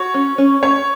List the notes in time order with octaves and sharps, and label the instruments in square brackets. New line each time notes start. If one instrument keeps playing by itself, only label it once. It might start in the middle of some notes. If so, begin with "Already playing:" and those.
Already playing: [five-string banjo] F#4 [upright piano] C#5
[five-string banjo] C#4
C#4
[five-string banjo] C#4 [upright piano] C#5